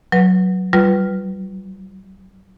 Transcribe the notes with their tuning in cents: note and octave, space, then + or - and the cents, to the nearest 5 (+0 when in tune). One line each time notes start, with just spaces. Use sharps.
F#3 +0 B4 -10
G3 -30 F4 +0 B4 +0